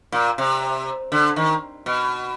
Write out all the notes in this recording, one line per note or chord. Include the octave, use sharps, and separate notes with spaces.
A#2
C3
D3
D#3
B2